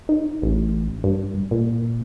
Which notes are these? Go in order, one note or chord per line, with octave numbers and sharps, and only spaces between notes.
D#4
A1
G2
A#2